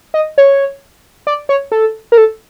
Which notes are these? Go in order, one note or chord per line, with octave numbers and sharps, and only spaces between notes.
D#5
C#5
D5
C#5
A4
A#4
A4